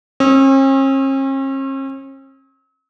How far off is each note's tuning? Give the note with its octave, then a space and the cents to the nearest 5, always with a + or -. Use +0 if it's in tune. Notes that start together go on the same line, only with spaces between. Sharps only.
C#4 -45 E6 -45